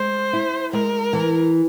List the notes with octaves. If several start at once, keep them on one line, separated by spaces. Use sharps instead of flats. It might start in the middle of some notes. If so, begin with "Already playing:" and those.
Already playing: G#3 C5
E4
G#3 A#4
E3